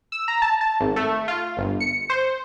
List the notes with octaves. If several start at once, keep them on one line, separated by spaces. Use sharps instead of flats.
E6
A#5
A5
A5
G#1
A3
F4
G1
C#7
C5